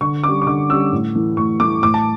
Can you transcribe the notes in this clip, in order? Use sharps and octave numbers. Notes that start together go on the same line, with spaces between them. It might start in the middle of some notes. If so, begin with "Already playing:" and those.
D3 C#6
G3 C#4 D6
C#6
D3 D6
G3 C#4 E6
A2
E3 A3
A2 C#6
E3 A3 D6
A2 D6
A5